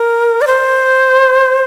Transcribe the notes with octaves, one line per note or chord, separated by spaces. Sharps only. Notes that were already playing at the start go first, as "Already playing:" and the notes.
Already playing: A#4
D5
C5